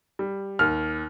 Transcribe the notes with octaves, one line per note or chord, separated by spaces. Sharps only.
G3
D#2 F6